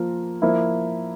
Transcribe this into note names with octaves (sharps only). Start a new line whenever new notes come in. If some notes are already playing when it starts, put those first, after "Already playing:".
Already playing: F3 A#3 F4 A#4
F3 A#3 E4